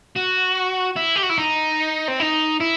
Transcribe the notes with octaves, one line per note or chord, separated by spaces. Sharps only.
F#4
E4
G4
F#4
E4
D#4
C4
D#4
E4